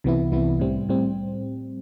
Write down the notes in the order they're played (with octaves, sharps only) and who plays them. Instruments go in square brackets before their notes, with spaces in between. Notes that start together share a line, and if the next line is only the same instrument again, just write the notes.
[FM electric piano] C2 C3 E3 B3 E4
C2 C3 E3 B3 E4
A2 G3 C4
A2 G3 C4